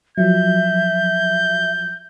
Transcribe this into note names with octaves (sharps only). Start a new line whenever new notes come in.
F3 F#3 E5 G6